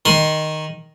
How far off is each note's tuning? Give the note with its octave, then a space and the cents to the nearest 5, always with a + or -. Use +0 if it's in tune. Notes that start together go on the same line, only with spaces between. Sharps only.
D#3 +0 C6 +0